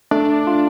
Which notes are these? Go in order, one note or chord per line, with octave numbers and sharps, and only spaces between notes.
A3 D4
F4